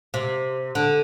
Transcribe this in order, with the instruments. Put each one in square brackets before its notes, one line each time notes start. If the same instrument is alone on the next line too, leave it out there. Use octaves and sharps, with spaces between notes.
[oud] C3
D3